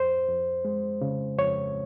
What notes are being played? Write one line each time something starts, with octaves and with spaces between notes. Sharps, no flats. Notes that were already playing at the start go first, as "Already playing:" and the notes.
Already playing: F2 C5
F2
G#3
C#3
F2 C#5